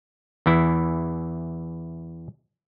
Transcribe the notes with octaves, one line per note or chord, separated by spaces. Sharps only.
E2 E3 E4